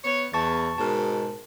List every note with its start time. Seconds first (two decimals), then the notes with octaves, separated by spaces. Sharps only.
0.04 B3 C#5
0.34 E2 A5 C#6 A6
0.78 G#2 B2 A#4 A5